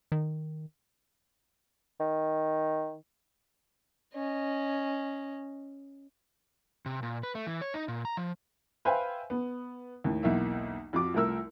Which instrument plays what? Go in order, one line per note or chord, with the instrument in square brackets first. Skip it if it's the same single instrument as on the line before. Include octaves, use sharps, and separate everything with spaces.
[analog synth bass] D#3
[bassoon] D#3
[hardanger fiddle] C#4 D#5
[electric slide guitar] C3
A#2
B4
A3
E3
C#5
D#4
A#2
A#5
F3
[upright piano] B4 C5 E5 F5 G5 G#5
B3
D#2 A2
B1 E2 A#3 E5
F2 F3 F#4 D6
C2 F3 A3 A#4 E6